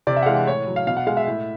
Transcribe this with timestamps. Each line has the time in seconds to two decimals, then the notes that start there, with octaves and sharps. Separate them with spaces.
0.07 C3 D5
0.17 E5
0.23 F#5
0.26 E3 G#3 F5
0.36 F#5
0.47 A2 C#5
0.67 F#3
0.76 F5
0.87 B2 F5
0.97 F#5
1.07 G#3 F5
1.17 E5
1.27 A2